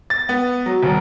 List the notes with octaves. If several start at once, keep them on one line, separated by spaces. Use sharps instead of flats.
A6
B3
F#3
D#1